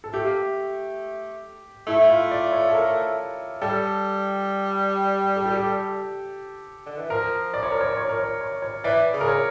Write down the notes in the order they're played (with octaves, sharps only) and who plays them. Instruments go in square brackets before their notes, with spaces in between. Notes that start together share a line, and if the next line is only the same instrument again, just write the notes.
[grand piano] A4
[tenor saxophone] A3 [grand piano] G4
[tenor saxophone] A#3
A3
[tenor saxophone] A3 [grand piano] E4
[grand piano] F4
D5
C#5
A4
A#4
[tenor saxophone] G3 [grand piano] A4
[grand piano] A4
G4
A4
[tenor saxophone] D3
E3
[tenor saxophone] F3 [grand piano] A#4
[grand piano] D5
C#5
A#4
C#5
C#5
A#4
C#5
C#5
C#5
[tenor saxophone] E3 [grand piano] D5
[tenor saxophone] C#3
[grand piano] A#4
C#5